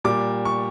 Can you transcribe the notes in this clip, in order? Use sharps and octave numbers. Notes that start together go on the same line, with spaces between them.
A#2 G3 D6
C#6